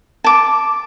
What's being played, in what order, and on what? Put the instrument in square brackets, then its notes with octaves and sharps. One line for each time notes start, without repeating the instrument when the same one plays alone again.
[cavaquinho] A5 D6